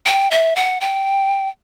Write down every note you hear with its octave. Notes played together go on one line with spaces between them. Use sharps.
G5
E5
F#5
G5